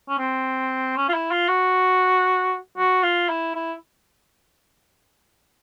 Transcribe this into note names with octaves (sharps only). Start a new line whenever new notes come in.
C#4
C4
C#4
F4
E4
F4
F#4
F#4
F4
E4
E4